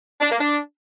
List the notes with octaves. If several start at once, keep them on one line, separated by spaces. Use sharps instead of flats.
D4
A#3
D4